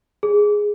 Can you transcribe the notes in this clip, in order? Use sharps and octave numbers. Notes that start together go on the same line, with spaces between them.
G#4